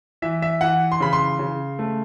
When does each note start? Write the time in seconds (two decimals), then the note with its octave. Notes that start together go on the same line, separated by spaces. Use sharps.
0.22 E3 E5
0.42 E5
0.61 E3 F#5
0.92 C6
1.00 C#3 B5
1.13 C6
1.39 C#3
1.79 A3